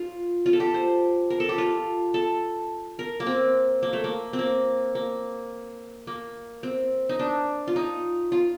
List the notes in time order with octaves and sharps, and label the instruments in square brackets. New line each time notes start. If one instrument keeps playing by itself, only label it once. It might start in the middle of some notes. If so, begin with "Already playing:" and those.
Already playing: [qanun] F4
F4
A4
G4
C5
A#4
A4
G4
F4
A4
A#4
A#3
C4
A#3
A3
A#3
C4
A#3
A#3
A#3
C4
D#4
D4
F4
D#4
F4